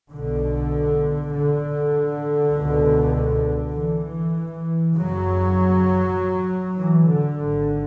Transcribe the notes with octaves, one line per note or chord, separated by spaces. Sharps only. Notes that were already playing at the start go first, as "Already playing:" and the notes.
B1 B2 D3
D3
C#2 B2
E3
F#1 F#2 C#3 F#3
E3
D3
G#1 G#2